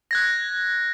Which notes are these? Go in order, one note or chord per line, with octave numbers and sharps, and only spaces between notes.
F#6 G#6 A#6